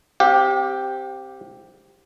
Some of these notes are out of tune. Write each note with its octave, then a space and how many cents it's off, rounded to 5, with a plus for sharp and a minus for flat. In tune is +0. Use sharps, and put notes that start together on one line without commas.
C4 +0 G4 +0 F5 +45